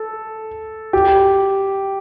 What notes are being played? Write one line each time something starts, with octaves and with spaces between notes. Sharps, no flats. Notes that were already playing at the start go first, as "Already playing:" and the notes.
Already playing: A4
G4